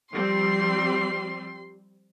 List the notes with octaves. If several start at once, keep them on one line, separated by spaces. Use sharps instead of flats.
F3 G3 C4 C6